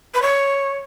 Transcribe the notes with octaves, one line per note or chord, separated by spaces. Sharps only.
B4
C#5